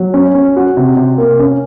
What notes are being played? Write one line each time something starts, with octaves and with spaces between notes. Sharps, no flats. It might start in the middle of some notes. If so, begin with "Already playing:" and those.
Already playing: F#3
C#4
C#4
F#4
C3
C3
A#3
C#4